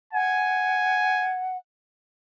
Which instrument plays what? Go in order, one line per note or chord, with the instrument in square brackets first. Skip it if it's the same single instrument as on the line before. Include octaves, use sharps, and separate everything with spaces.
[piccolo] F#5 [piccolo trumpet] G#5